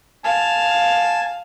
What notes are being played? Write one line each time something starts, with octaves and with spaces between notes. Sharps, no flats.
F5 G#5 A5